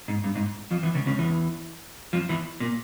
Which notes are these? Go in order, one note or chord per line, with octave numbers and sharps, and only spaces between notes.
G#2
G2
G#2
F2 F3
E2 E3
C#2 C#3
C#2 C#3
E2 E3
F2 F3
E2 E3
A#2